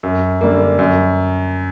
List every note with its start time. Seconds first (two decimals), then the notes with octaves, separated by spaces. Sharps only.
0.03 F#2
0.41 D3 G3 A#3
0.79 F#2